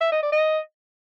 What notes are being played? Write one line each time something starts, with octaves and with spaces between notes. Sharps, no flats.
E5
D#5
D5
D#5